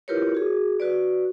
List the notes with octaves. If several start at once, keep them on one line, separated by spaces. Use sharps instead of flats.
E4 F4 G4 A#4 B4 C#5
F#4 G#4
F#4 B4 D5